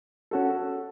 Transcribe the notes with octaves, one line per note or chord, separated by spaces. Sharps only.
C#4 F#4 A4